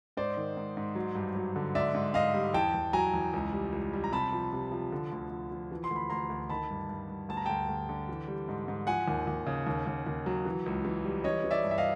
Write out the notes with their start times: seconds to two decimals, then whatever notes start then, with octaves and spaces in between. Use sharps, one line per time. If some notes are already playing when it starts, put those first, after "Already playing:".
0.17 G#2 C5 D5
0.37 D#3
0.57 G#2
0.77 G#2
0.95 F#3
1.15 G2
1.35 F#3
1.56 D3
1.75 G#2 D5 E5
1.94 G#2
2.14 G#2 D#5 F5
2.34 G3
2.54 E2 G5 A5
2.74 E2
2.93 F#3 G#5 A#5
3.13 E2
3.33 C#2
3.53 G3
3.72 C#2
3.93 G3
4.04 A#5
4.12 C3 A5 B5
4.32 F3
4.53 C3
4.72 F3
4.92 D3
5.12 D2
5.31 F3
5.51 F3
5.71 E3
5.84 C6
5.90 D2
5.96 B5
6.10 D2 A#5 C6
6.30 D2
6.49 D#3 A5 B5
6.70 G2
6.89 G2
7.09 G2
7.29 D2 A5
7.37 A#5
7.45 D2 G5 A5
7.69 D2
7.89 D3
8.09 E3
8.28 G3
8.48 G#2
8.68 G#2
8.87 F3 F#5 G#5
9.08 D#2
9.27 D#2
9.46 C#3
9.67 D#2
9.87 D#2
10.07 D#2
10.26 F#3
10.45 E3
10.66 C#2
10.85 E3
11.04 G3
11.24 E3 C#5 D#5
11.44 E3
11.51 D5 E5
11.64 G2
11.71 E5
11.78 D#5 F5